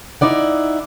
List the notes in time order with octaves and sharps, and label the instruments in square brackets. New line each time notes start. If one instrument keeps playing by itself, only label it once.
[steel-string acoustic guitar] D#4 E4 D5 F#5